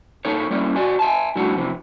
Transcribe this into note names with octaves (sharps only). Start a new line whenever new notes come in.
A#2 D#4 A4 C#5
G3 A#3 C#4 E4 D5
F#4 D5 G#5
E5 G#5 A5
A2 D3 G3 D4 E4 F#4
F2 C3 E3